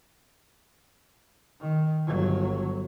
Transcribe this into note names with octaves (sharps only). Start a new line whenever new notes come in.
D#3
G1 F#3